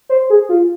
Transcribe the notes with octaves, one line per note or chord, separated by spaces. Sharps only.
C5
G#4
F4